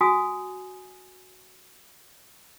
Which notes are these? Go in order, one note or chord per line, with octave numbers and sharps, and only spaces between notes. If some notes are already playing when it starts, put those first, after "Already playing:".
F#4 G#5 D#6